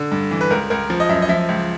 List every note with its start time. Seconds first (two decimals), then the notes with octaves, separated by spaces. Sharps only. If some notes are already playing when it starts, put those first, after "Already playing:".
Already playing: D3
0.12 G2
0.31 E3
0.41 B4
0.50 C#2 A#4
0.70 C#2 A#4
0.90 F3
1.00 D#5
1.09 F#2 E5
1.22 D#5
1.29 F3 E5
1.49 C#2